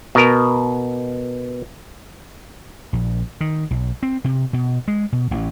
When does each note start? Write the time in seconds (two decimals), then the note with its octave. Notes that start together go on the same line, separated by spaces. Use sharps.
0.15 B2 A#4
2.93 A#1
3.41 D#3
3.71 B1
4.03 C4
4.24 C3
4.53 B2
4.88 G#3
5.12 B2
5.31 A1